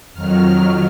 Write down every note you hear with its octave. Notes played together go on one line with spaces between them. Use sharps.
F2 D#3 F#3 F6